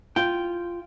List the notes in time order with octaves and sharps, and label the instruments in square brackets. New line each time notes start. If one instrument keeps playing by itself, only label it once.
[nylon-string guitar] F4 [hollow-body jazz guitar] G5